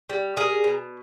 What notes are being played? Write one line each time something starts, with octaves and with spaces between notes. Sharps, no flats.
G3
G3 G#4 A#4
B2